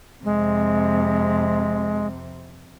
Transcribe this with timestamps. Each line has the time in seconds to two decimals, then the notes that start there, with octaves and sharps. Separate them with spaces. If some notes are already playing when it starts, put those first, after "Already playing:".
0.25 F2 C3 G#3